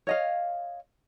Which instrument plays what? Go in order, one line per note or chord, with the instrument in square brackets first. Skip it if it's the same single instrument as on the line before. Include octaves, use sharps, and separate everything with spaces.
[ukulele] C#5 D#5 F5